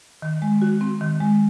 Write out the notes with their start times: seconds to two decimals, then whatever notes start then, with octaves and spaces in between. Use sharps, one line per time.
0.22 D#3
0.42 G#3
0.62 F#4
0.81 C4
1.01 D#3
1.20 G#3